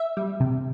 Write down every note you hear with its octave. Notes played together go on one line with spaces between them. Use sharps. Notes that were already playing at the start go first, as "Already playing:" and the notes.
Already playing: E5
G3
C3